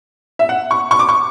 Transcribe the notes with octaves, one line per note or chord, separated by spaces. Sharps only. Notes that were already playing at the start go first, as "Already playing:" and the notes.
E5
F#5
C#6
C#6
D6
C#6